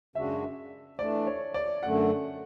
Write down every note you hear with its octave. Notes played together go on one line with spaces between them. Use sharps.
F#2 C#3 G#3 D4 F#4 E5
E3 A3 D4 D5
C#5
D5
F#2 D3 A3 F#5